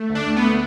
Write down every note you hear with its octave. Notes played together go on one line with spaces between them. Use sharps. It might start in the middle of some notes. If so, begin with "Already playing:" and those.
Already playing: A3
D2
D4
D2
B3
A3